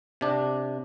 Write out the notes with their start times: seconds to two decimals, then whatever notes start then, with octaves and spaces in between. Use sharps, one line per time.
0.21 C3 D4